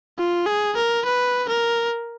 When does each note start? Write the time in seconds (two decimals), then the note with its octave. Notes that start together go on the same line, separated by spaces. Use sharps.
0.19 F4
0.47 G#4
0.76 A#4
1.05 B4
1.48 A#4